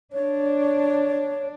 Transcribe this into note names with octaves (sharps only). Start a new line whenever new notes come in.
D4 C#5